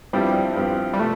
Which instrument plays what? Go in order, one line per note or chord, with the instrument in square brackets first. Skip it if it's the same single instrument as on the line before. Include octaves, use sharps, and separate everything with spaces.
[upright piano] G2 F3 C4 E4 G4 [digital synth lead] G3
[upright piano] G2 F3 C4 E4 G4
[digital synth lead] G3
[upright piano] C3 F3 [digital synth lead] A3